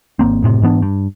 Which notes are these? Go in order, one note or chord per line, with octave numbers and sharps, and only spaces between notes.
G#1 A#3 C4
F#1 A2 C3
G#2 E3 B3 D4
G2